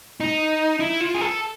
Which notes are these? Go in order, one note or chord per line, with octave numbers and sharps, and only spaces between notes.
D#4
E4
F4
G#4
A4